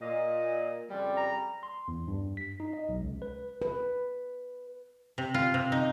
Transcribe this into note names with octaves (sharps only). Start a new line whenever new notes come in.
A#2 D#5
F2 C#3 G3
A#5
C6
E2
G2
B6
D#4
D#5
B1
C#2
B4
B4
C3
F4
C3
D#4